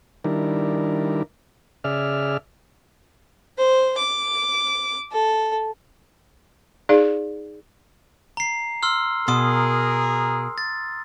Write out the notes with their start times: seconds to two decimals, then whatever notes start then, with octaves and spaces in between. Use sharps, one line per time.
0.24 D#3 G3 D4 E4 A#4
1.84 C#3 G#4 D5 E5 F6
3.58 C5
3.98 D6
5.12 A4
6.89 D#4 G#4 D5 F5
8.37 A#5 C7
8.83 C6 E6 F6
9.28 B2 G#4 A#4 C6 D#6
10.58 A6